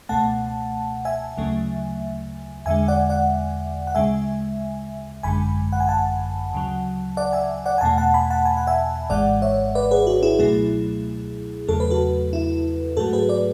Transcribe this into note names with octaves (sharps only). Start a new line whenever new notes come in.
C#2 B2 A3 F#5 A5
E5 G#5
D2 C#3 F#3 A3
E2 D3 G#3 E5 G#5
D5 F#5
D5 F#5
F#5
D2 C#3 G#3 E5 G#5
G#1 F#2 D3 G#3 G#5 B5
F#5
G#5
F#5 A5
D2 C#3 F#3
D5 F#5
E5 G#5
D5 F#5
G#5
E2 B2 A3 F#5 A5
F#5 A5
G#5 B5
F#5 A5
G#5
F#5
E5 G#5
G#1 G#2 E3 G#3 D5 F#5
C#5 E5
B4 D5
G#4 B4
F#4
E4 G#4
C#2 B2 F#3 A3 E4 G#4
E2 C#3 F#3 A3 A4
B4
F#4 A4
E4
G#2 F#3 A3 F#4 A4
G#4 B4
B4 D5